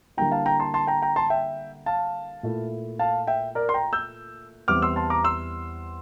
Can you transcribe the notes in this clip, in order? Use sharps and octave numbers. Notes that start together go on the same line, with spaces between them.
D3 G3 A#3 E4 G5 A#5
F5 A5
G5 A#5
A5 C6
A5 C6
G5 A#5
G5 A#5
A5 C6
E5 G5
F5 A5
A#2 A3 E4
F5 A5
E5 G5
A#4 D5
C6
G5 A#5
E6 G6
E2 E3 G3 C4 E4 D6 F6
C6 E6
A5 C6
A#5 D6
C6 E6